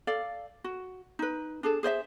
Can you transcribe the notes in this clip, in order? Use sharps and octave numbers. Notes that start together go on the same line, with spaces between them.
A4 D5 F5
F#4
D#4 B4
D4 G#4 A4
G#4 C5 D5 E5